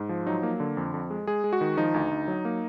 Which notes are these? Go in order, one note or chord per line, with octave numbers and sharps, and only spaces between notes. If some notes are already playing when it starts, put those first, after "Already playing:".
Already playing: G#2
F3
F#3 D#4
A#3
D3
F2
F2
G#3
G#3 G#4
G#3
F#4
D#3
F3 D#4
D2
D2
F#3
A#3